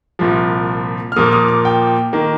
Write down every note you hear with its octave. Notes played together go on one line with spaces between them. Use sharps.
C2 A#2 F3
F6
A#2 F3 A#3 D#6
D#6
D6
G5
D#3 A#3